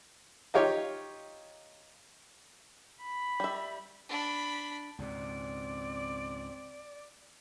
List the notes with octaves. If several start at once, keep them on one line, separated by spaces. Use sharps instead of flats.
D#4 F4 G4 C#5
B5
G3 E5
D4 B5
C#2 G#2 B2 C4 D5